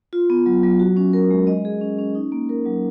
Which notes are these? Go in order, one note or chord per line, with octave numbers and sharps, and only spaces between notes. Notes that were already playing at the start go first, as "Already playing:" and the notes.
F4
B3
F#3
F#3
F#4
C#4
A#4
G#3
D#5
G#4
C#4
C#4
D#4
A#3
A#4
F#3